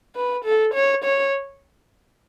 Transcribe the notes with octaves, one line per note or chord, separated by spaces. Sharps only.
B4
A4
C#5
C#5